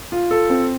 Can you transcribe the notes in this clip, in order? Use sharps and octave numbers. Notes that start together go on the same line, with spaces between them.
F4
A4
C4